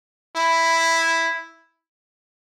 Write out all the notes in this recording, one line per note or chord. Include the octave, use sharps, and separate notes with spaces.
E4